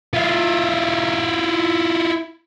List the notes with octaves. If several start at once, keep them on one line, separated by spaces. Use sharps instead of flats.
E4 F4